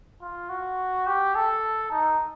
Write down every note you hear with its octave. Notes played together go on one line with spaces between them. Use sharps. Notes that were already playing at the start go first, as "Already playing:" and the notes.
F4
F#4
G4
A4
D#4